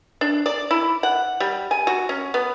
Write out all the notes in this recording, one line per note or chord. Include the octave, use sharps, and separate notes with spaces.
D4
D5
E4
F#5
G3
G#5
F#4
C#4
B3